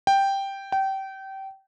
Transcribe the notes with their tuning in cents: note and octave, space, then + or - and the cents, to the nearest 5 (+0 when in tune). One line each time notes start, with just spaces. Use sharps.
G5 +0
G5 -25